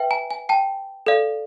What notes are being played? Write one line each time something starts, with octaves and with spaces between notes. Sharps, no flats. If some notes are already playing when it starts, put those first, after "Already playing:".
Already playing: B4 E5 G5
G#5 A#5
G#5
G5 A5
A4 D5 F5